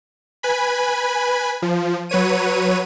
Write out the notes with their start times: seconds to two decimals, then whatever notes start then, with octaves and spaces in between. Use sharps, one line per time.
0.43 B4 G#5 B5
1.62 F3
2.09 F#3 B4 C#5 D#7